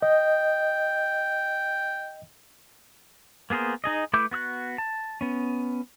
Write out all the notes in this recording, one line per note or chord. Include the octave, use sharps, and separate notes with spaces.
D#5 G5
A#3 B3 G#4 A#4 C5
D#4 G#4 D#5
A3 E4 B4 D6 G6
B3 F#4 E6 F#6
A5
B3 C#4